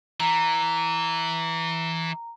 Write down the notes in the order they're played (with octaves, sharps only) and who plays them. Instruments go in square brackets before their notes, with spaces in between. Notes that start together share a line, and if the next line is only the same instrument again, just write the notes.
[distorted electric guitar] E3 [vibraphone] A#5